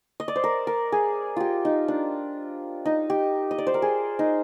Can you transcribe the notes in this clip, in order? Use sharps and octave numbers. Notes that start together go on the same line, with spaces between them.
D#5
D5
C5
A#4
A#4
G#4
F4 G4
D#4
D4
D#4
G4
D#5
D5
C5
A#4
G#4
D#4